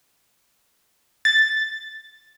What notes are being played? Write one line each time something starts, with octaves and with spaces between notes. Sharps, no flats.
A6